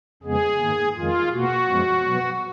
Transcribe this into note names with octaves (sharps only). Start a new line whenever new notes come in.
F2 C#3 G#3 B3 G#4
G#2 D#3 A#3
F2 D#3 G#3 F4
B2 A#3 F#4
F#2 F3 G#3 B3
B2 F#3 B3